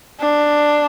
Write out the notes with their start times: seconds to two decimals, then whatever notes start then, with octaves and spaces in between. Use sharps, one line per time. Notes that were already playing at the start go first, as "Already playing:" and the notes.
0.21 D4